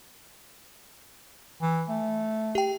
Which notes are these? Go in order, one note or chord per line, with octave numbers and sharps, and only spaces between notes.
E3
A3
G4 G5